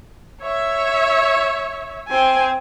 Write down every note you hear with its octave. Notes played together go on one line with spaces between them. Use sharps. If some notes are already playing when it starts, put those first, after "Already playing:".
C#5 E5
C4 G#5